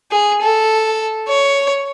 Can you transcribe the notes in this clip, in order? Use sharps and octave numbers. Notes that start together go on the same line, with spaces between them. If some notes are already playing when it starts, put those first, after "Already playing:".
G#4
A4
C#5